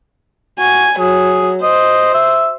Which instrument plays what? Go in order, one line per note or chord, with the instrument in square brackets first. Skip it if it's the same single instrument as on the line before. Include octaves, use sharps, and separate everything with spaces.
[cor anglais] F#4 [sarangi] G#5
[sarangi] F#3 [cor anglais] G#4
[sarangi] C5 [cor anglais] D#5
[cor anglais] E5